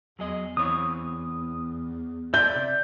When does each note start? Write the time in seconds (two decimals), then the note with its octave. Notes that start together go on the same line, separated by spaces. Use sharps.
0.19 E2 F#3 G#4 D#5
0.57 E3 C4 C#5 D#6
2.34 D5 E5 G6
2.55 C3